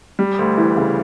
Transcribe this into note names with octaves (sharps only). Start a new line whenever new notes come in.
G3
D2
E3
C#3